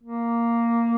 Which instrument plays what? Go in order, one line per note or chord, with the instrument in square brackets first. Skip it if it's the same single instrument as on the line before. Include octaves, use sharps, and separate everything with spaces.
[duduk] A#3